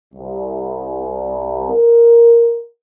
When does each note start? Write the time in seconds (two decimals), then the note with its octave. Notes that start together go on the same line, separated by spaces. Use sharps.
0.13 C2
1.70 A#4